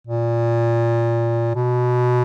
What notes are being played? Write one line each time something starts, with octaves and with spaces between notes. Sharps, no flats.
A#2
B2